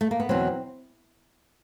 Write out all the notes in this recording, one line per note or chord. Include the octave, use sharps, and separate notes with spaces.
A3
A#3
B3
E2 B2 F#3 C4